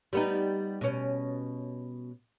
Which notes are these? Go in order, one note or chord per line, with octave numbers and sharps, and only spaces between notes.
G3 B3 D#4
B2 C#4